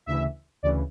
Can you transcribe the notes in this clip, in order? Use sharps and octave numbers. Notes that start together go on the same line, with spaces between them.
D2 C#3 E3 E5
D2 C#3 E3 D5